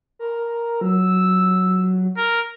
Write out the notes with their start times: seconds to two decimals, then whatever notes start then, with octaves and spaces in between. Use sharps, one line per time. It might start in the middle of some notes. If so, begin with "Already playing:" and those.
0.19 A#4
0.81 F#3 E6
2.17 A#4